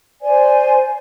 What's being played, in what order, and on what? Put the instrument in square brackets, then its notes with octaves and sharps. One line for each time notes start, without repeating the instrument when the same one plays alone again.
[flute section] C5 D5 G#5